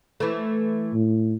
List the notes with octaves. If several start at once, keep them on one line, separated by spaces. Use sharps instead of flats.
E3 A3
A2